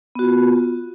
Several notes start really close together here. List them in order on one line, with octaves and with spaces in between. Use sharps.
B3 F#4 F4